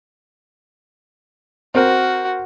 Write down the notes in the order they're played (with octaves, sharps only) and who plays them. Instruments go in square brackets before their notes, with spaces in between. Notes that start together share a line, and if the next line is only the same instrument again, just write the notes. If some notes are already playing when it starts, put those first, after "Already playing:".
[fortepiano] C4 A#4 [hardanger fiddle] F#4